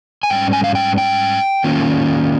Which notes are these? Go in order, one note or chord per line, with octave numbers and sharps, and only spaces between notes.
G#5
G#2 G3 C#4 G5
G#5
F5
G5
G5
D#3 A#3 C#4 F4